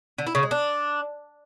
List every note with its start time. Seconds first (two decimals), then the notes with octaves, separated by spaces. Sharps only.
0.18 D3
0.27 E4
0.35 C#3
0.43 G#3
0.51 D4